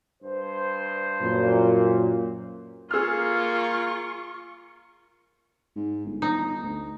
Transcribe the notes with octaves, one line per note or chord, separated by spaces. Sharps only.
G2 C5
F#2 A#2
A#3 F4 G#4 C#6 E6 F6
G#2
G1
D#4
D2